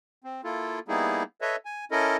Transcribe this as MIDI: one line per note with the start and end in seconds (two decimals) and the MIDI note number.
0.24 0.41 60
0.44 0.79 58
0.44 0.79 64
0.44 0.79 65
0.44 0.79 69
0.88 1.23 55
0.88 1.23 58
0.88 1.23 59
0.88 1.23 63
0.88 1.23 64
0.88 1.23 68
1.41 1.56 69
1.41 1.56 71
1.41 1.56 73
1.41 1.56 75
1.41 1.56 76
1.65 1.85 80
1.91 2.17 61
1.91 2.17 64
1.91 2.17 69
1.91 2.17 70
1.91 2.17 75